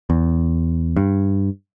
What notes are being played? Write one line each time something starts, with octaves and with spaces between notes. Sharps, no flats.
E2
G2